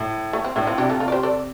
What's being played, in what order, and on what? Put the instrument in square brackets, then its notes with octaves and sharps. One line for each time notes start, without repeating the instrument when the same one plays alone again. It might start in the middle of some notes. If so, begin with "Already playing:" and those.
Already playing: [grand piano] A2
[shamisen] A3
C4
[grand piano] A2 [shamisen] A3 D4
[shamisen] C4 F4
[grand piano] C3 [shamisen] D4 G4
[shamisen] F4 A4
F4 A4
D5
G4 C5
A4 D5